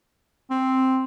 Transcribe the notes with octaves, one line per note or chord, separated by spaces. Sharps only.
C4